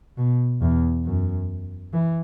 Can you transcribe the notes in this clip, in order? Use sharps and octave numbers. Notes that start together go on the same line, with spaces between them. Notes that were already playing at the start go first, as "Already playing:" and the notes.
B2
E2
F#2
E3